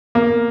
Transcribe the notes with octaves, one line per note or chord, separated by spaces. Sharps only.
A#3